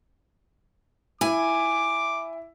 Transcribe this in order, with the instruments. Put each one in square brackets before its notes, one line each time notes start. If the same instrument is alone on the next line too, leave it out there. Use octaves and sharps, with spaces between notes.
[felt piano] E4 [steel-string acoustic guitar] G#5 [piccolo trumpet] D6